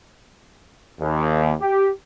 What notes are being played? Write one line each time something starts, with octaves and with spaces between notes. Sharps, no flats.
D#2
G4